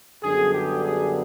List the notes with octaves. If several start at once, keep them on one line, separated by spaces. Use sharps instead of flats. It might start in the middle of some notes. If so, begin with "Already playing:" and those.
F#2 D3 G3 B3 G#4
G4
G#4